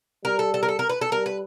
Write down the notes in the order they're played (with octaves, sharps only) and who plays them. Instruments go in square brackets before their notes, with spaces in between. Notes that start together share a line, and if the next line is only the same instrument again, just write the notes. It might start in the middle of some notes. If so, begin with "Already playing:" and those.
[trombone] G3 [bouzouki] A#4
[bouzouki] A4
A4
A#4
A4
A#4
B4
A4
[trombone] G3 [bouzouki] A#4
[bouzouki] B4